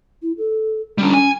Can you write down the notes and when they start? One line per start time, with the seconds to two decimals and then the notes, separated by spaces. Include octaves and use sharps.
0.22 E4
0.37 A4
0.98 D3 G3 C#4
1.14 G#5